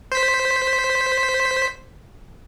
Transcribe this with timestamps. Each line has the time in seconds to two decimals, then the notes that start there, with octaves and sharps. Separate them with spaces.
0.12 C5 B6